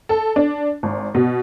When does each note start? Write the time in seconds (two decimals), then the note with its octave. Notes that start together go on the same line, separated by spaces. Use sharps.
0.09 A4
0.36 D4
0.83 G#1
1.15 B2